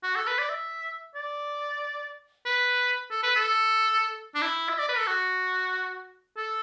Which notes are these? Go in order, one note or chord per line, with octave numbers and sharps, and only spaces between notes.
F#4
A4
B4
D5
E5
D5
B4
A4
B4
A4
D4
E4
E5
D5
B4
A4
F#4
A4